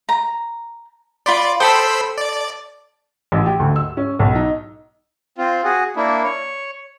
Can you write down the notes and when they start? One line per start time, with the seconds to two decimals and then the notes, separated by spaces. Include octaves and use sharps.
0.09 A#5
1.26 F4 D5 B5 C6
1.60 A4 C5 G5 B5 D#6 E6
2.18 D5
3.32 A1
3.46 G4
3.59 D2
3.76 E6
3.97 C#4
4.19 B1
4.35 D#4
5.38 C4 F4
5.64 F#4 G#4
5.96 A#3 D4 E4
6.24 C#5